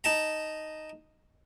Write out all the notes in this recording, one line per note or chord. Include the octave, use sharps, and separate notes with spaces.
D#4 A5 A#5